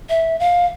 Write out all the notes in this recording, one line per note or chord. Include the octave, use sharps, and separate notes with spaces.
E5
F5